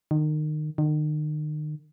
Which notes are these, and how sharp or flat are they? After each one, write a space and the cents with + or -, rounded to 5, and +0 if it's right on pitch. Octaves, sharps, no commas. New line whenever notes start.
D#3 -30
D#3 -40